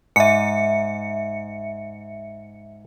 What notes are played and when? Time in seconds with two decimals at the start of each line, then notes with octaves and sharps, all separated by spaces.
0.16 G#2 E5 C#7